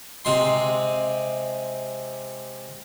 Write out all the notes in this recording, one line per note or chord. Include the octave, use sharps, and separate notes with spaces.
C3 G#3 C6